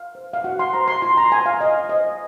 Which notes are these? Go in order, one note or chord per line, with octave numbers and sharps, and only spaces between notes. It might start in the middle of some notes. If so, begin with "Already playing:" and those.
Already playing: F5
C5
F5
F#4 F#5
C6
C5 A#5
C6
F4 C6
A#5
C5 G#5
F5
F4 D#5
C5 D#5